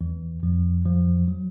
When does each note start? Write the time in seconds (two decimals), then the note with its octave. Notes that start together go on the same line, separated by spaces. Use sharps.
0.01 E2 E3
0.43 F2 F3
0.86 F2 F3
1.28 F#3